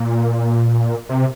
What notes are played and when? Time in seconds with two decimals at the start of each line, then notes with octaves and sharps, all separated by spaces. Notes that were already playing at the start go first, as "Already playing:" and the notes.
Already playing: A#2
1.09 C3